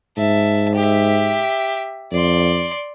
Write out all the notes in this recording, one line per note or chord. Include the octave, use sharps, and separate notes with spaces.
G#2 E5 A5
G4 E5
F2 D5 C6